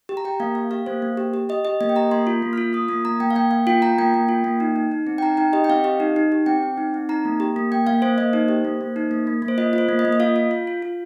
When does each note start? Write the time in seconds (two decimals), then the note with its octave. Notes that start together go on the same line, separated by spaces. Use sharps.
0.09 G4
0.17 A#5
0.25 G4 G5
0.40 A#3 F5
0.55 G4 F5
0.71 G4 F5
0.86 A#3 C5
1.02 A#3
1.17 G4
1.34 G4
1.49 G4 D#5
1.65 G4 D#5
1.81 A#3 D#5
1.89 G5
1.96 G4 A#5
2.11 A#3 C6
2.27 F4
2.42 A#3
2.53 F4 F6
2.73 F4 D#6
2.88 A#3 D#6
3.05 A#3 A#5
3.20 A#3 G5
3.31 F5
3.36 A#3 G5
3.51 A#3 F5
3.67 F4 G5
3.82 F4 A#5
3.98 A#3 G5
4.14 A#3
4.29 F4
4.44 A#3
4.60 D#4
4.76 D#4
4.92 D#4
5.07 C4
5.18 G5
5.22 D#4 A#5
5.37 D#4 G5
5.53 G4 D#5
5.64 G5
5.69 C4 F5
5.84 G4 D#5
6.00 D#4
6.16 D#4
6.32 G4
6.46 C4 G5
6.63 C4
6.77 D#4
6.94 C4
7.09 D#4 A#5
7.25 A#3
7.40 G4
7.56 A#3
7.72 A#3 G5
7.87 A#3 F5
8.02 A#3 C5
8.18 A#3 D#5
8.33 D#4 C5
8.48 G4
8.65 A#3
8.81 A#3
8.96 D#4
9.11 A#3
9.27 A#3
9.42 A#3
9.48 C5
9.58 F4 D#5
9.73 F4
9.78 C5
9.89 A#3
9.99 D#5
10.05 A#3
10.13 D#5
10.20 F4 F5
10.36 F4
10.51 F4
10.67 F4
10.82 F4